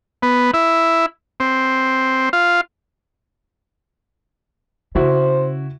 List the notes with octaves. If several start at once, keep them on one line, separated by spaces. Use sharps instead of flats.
B3
E4
C4
F4
C#3 E4 F#4 C5 E5